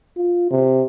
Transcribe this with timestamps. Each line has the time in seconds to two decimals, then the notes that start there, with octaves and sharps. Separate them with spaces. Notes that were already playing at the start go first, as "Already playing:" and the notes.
0.17 F4
0.51 C3